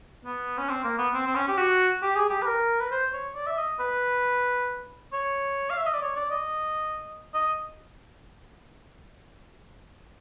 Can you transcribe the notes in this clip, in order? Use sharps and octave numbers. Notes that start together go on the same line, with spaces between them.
B3
C#4
C4
A#3
B3
C4
C4
C#4
G4
F#4
G4
G#4
G4
B4
A#4
B4
C5
C#5
D5
E5
D#5
B4
C#5
F5
E5
D#5
D5
C#5
D5
D#5
D#5